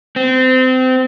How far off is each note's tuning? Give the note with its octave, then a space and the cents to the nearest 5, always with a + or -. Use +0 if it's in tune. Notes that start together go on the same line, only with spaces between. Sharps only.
C4 -25